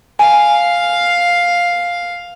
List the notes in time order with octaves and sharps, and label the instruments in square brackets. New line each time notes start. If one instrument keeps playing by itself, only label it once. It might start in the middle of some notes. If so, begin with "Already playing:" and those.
[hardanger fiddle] F5 [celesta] G#5